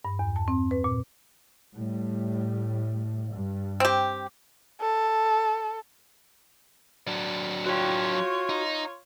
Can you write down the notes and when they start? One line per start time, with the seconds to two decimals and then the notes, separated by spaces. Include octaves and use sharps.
0.05 G2
0.19 E2
0.36 A5
0.48 C4
0.71 B4
0.84 A#2
1.76 A2 G3
3.36 G2
3.80 C4 G4
4.81 A4
7.07 F#3 D4
7.66 F4 F#4 C#5 G5
8.49 D#4